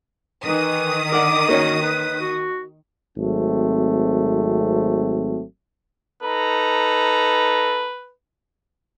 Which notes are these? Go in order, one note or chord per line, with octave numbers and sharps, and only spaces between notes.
D#3 E3 D#6
A#4 D5 F#5 D6
A#3 C#4 F#4 C#5
B4
F#4
G#1 F#3 A3 C4
D#4 A4 B4 A#5